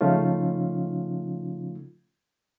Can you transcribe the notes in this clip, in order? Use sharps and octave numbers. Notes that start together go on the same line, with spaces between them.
C#3 F3 A3 C#4 D#4 F4